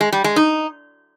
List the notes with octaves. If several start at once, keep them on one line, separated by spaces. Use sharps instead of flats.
G#3
G3
G#3
D#4